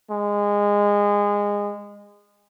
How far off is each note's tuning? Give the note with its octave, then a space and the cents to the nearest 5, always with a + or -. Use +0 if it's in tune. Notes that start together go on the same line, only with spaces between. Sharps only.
G#3 -20